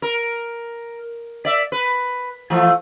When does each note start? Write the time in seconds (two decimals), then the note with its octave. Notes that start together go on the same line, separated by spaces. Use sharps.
0.02 A#4
1.45 D5 E5
1.72 B4
2.50 E3 F3 A3